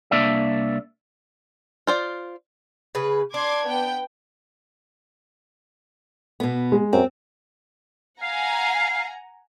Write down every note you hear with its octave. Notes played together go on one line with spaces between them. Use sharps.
C2 A#3 D4 D5 E5
F4 C5 D5
C#3 G#4 B4
D4 C6 D6 G#6
B3 G5
B2 B3
G#3
F#2 C4
F5 F#5 G#5 A#5